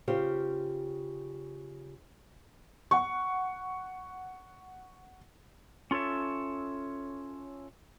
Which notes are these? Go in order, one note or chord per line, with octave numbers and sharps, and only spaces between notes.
C#3 F4 G4 C5
F#5 C#6
C#4 F4 A4 C#5 E5